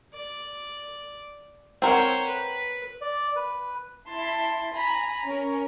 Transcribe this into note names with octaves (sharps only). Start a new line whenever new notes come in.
D5
C4 A#4 C5 C#5 F#5
B4
D5
B4
E4 A5 C6
G#5 A#5 B5
C#4 A#4